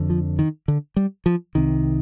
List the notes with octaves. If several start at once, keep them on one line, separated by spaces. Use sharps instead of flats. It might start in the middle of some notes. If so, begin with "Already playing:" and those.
Already playing: F2 D3
F3
D#3
D3
G3
F3
C2 C3 D#3